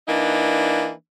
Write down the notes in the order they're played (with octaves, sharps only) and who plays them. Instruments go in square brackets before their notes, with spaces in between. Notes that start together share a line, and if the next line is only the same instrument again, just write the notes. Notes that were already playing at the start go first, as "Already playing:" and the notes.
[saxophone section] E3 A#3 D4 D#4